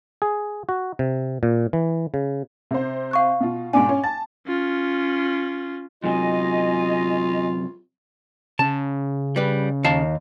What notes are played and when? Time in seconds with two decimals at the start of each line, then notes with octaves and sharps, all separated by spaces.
0.22 G#4
0.69 F#4
0.99 C3
1.43 A#2
1.73 E3
2.14 C#3
2.71 C3 C5
3.11 F5 C#6 F#6
3.40 B2 F4
3.73 G#2 B2 D4 G#5 D6 D7
3.89 C#4
4.04 A5 A6
4.47 C#4 F4
6.04 F#2 C3 F#3 F4 D#5 G#5
8.59 C#3 A5
9.36 G3 B4
9.84 D#2 F5 A5